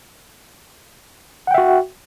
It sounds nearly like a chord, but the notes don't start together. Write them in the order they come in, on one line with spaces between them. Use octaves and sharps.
F#5 G5 E5 F#4